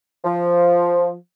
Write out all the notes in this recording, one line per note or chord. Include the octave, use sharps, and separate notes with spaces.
F3